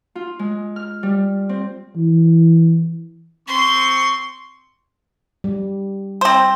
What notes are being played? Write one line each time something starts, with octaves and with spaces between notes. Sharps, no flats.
F4
G#3
F6
G3
C4
E3
C4 C6 C#6
G3
C4 C5